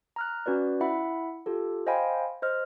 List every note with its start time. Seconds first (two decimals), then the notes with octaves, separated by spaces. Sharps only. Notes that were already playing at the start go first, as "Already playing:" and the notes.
0.16 A#5 F6 F#6
0.46 C#4 F#4 B4 D5
0.81 E4 E5 F#5 B5
1.46 F4 G4 A4
1.86 C5 D#5 F5 G5 G#5 B5
2.42 C5 D#5 F6